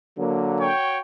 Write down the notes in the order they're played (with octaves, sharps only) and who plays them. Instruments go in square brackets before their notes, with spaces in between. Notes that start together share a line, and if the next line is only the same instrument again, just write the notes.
[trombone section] D3 F#3 A#3
[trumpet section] F#4 C#5 G5